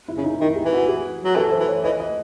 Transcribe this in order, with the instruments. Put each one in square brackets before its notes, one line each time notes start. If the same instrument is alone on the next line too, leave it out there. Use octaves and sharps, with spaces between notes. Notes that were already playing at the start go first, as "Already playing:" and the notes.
[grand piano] E4
[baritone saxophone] C#3
[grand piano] D#4
[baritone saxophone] D#3 [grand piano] E4
[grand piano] G#4
[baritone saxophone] E3
[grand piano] F#4
G#4
[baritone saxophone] F#3
[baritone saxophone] E3 [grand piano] A4
[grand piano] C5
[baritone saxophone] E3
[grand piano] C#5
[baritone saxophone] E3 [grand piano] D#5
[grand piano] D#5